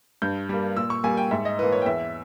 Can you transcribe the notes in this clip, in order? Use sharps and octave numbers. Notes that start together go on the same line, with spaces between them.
G2 G6
G3 A#3
A#2 E6
C#6
G3 A#3 G#5
G5
G#2 E5
D#5
E3 A#3 B4
C#5
G5
E2 E5